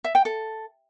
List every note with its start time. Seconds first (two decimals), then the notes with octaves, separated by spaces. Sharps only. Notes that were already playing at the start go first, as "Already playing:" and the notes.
0.04 E5
0.15 G5
0.25 A4